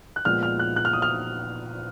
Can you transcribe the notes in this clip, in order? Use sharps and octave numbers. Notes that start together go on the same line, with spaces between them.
F#6
A#2 F3 G#3 B3 F6
F6
F#6
F#6
F6
D#6
F6